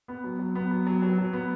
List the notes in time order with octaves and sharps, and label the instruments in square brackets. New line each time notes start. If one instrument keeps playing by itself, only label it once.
[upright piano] B3
F#3
F#3
B3
F#3
F#3
F#3
F#3
B3